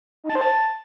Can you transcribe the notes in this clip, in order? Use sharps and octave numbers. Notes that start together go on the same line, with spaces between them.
D#4
A5
C5
A5